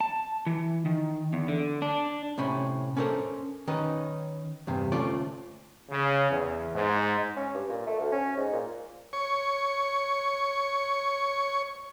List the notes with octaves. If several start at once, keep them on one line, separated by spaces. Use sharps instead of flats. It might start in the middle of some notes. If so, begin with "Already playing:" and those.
A5
E3
D#3
E2
D3
D4
A2 C3 C#4 B5
C#4 D4 A4 A#4 C5
D#3 C#4 D#4 B4
E2 G2 C3
D2 A3 C#4 F4 D5
C#3
E2
G#2
C#4
G2
A#2
A3
D2
C#4
G#2
A#2
C#5 C#6